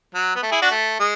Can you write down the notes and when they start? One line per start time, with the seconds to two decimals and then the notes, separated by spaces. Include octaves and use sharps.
0.14 F#3
0.35 B3
0.42 A3
0.51 E4 G#4
0.62 D4 F#4
0.71 A3
0.99 G#3